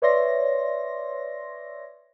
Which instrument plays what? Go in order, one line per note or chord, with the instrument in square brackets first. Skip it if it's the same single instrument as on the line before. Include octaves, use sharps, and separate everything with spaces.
[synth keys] B4 C#5 D5 E5 C6 A#6